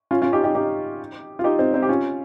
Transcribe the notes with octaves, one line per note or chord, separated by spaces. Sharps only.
C#4 F4
C#4 F4
D#4 G4
D#4 G4
D#4 G4
F4
D#4 G4
C4 D#4
C4 D#4
G4
C#4 F4